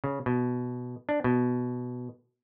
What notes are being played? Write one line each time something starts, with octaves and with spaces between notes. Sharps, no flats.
C#3
B2
D4
B2